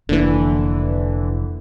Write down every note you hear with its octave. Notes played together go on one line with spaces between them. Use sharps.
F1 D3 E3 A#3